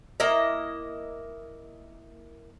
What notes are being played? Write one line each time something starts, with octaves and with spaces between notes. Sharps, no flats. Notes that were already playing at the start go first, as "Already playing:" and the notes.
A#3 E4 D#5